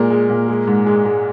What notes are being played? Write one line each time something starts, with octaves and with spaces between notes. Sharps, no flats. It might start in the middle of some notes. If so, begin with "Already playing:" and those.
Already playing: A#2 G#3 A#4
G#3
A#2
G#3
G#2
G#3
G#3